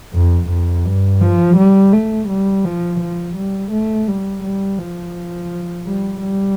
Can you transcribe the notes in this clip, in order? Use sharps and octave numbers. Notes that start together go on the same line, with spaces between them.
F2
F2
G2
F3
G3
A3
G3
F3
F3
G3
A3
G3
G3
F3
G3
G3